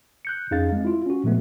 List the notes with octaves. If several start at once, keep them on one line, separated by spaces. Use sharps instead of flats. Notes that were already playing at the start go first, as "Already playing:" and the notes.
F#6 G6 C#7
F2 C#4 D#4 G#4 F5 A6
G#3 C4
E4 F4
C#4 F#4
A#2 F3 G#3 A3 B3